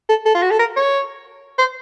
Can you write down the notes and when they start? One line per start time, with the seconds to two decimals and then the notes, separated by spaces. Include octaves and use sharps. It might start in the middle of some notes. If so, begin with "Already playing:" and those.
0.09 A4
0.26 A4
0.35 F4
0.42 F#4
0.51 A4
0.59 A#4
0.76 C#5
1.58 C5